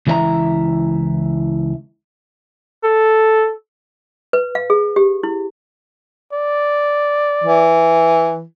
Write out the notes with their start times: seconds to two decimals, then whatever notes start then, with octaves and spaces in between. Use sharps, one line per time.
0.07 C#2 E3 E4 G#4 E5 A#5
2.84 A4
4.33 B4
4.55 F5
4.70 G#4
4.96 G4
5.23 E4
6.33 D5
7.44 E3